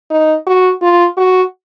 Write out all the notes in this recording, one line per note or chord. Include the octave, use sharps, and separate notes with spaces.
D#4
F#4
F4
F#4